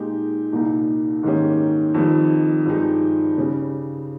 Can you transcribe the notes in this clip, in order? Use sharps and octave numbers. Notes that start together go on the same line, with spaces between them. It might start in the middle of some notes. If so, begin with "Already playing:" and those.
Already playing: A#2 G#3 D#4 G4
C2 A#2 G3 A#3 D#4
G#2 D#3 A#3 C#4 G4
F2 D#3 G3
G2 F3 G#3 D#4 G4
C#3 G3 C#4